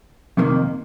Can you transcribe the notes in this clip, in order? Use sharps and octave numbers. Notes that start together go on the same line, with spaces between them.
F2 C3 D#3 A#3